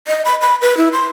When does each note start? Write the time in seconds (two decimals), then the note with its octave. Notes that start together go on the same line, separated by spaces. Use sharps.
0.08 D#5
0.25 B5
0.41 B5
0.62 B4
0.77 E4
0.93 C6